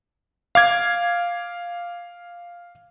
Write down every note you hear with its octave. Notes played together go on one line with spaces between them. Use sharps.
F5 D6 G#6